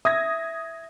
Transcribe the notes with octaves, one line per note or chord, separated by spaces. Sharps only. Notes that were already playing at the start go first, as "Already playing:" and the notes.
E5 D#6 G#6 A#6